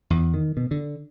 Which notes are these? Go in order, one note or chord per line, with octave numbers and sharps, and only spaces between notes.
E2
D#3
B2
D3